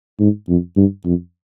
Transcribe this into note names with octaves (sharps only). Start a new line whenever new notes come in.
G#2
F2
G2
F2